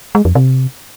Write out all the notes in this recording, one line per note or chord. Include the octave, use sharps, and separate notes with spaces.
G#3
F2
C3